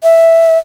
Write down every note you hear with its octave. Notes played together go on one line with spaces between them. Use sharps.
E5